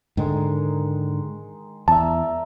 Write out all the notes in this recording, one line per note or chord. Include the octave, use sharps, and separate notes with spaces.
G#2 D3 D#3 G#3
E2 A#4 D5 E5 A5